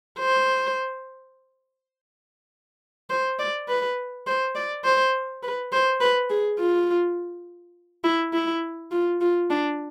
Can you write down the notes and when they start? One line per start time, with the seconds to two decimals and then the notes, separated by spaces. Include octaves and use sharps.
0.19 C5
3.10 C5
3.39 D5
3.69 B4
4.27 C5
4.55 D5
4.84 C5
5.43 B4
5.72 C5
6.01 B4
6.30 G#4
6.60 F4
8.04 E4
8.34 E4
8.91 F4
9.21 F4
9.50 D4